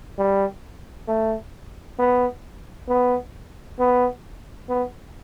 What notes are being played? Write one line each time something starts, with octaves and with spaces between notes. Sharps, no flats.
G3
A3
B3
B3
B3
B3